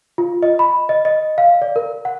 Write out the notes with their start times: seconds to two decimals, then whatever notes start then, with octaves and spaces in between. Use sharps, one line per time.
0.18 F4
0.43 D#5
0.59 B5
0.89 D#5
1.05 D#5
1.38 F5
1.62 D5
1.76 A#4
2.05 F#5